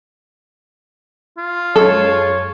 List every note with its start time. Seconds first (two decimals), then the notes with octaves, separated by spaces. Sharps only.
1.38 F4
1.76 F#2 G#3 A4 C#5